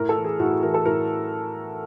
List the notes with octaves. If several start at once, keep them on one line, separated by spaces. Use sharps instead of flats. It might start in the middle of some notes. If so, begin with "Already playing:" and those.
Already playing: A2 A#4
A4
E3
G#4
A2 F#4
G#4
E3 A#4
A4
A2 A#4